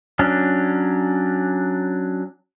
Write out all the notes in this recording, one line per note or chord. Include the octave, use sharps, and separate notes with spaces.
F#3 C#4 D4